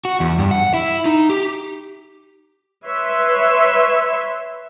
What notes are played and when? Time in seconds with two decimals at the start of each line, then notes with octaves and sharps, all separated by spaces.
0.05 F#4
0.20 E2
0.38 G2
0.51 F#5
0.74 E4
1.06 D#4
1.29 G4
2.84 B4 C#5 E5 C6